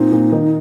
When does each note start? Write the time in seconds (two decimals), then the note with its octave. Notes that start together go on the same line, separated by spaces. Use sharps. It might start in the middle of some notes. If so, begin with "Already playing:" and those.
Already playing: A#2 C4 D#4
0.12 A#2
0.32 D#3